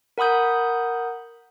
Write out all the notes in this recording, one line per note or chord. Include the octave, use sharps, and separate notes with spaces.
A#4 F#5 B5 D#6 G6